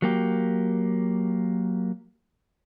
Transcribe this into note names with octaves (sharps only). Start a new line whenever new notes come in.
F#3 A#3 G4